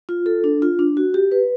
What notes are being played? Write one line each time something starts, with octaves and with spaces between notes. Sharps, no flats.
F4
A4
D4
F4
D4
F#4
G4
B4